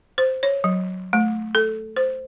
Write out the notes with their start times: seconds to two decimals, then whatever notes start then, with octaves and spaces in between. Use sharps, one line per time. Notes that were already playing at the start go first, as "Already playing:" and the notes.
0.18 C5
0.43 C#5
0.64 F#3
1.13 A3
1.55 A4
1.96 C5